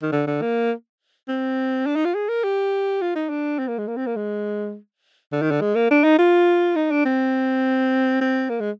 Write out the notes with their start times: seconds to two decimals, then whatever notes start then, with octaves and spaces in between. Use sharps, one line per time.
0.02 D#3
0.12 D3
0.27 D3
0.42 A#3
1.28 C4
1.86 D4
1.96 D#4
2.05 F4
2.15 G#4
2.29 A#4
2.44 G4
3.01 F4
3.16 D#4
3.30 D4
3.59 C4
3.68 A#3
3.78 G#3
3.87 A#3
3.97 C4
4.07 A#3
4.16 G#3
5.32 D3
5.42 D#3
5.51 D3
5.61 G#3
5.75 A#3
5.90 D4
6.04 D#4
6.19 F4
6.76 D#4
6.91 D4
7.05 C4
8.21 C4
8.50 A#3
8.60 G#3